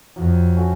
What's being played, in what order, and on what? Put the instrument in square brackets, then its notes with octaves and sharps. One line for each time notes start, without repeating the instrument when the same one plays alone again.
[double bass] F2 [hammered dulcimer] F#3
[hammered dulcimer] A3 C#4 F#4